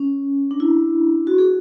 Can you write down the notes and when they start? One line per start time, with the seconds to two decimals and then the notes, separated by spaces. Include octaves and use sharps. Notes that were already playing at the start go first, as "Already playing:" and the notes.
Already playing: C#4
0.51 D4
0.60 E4
1.27 F#4
1.38 G#4